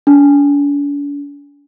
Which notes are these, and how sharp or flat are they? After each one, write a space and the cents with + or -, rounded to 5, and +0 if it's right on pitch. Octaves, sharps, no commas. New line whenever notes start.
D4 -45